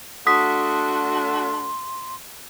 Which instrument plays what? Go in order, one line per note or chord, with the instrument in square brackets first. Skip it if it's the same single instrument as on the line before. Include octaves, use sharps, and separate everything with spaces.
[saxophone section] A3 D4 F#4 [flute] C6 [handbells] D#6 B6